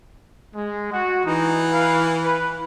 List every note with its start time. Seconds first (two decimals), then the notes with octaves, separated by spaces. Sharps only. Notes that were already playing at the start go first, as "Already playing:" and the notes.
0.55 G#3
0.93 F#4
1.25 E3 D#4
1.72 B4 F5
2.23 B4